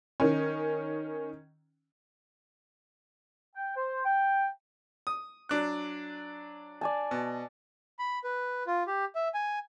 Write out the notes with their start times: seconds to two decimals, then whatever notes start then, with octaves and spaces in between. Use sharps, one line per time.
0.20 D#3 C#4
3.56 G5
3.76 C5
4.05 G5
5.07 D#6
5.49 F#3 D4 F#6
6.81 D5 G#5 A5
7.11 B2
7.99 B5
8.24 B4
8.67 F4
8.87 G4
9.15 E5
9.34 G#5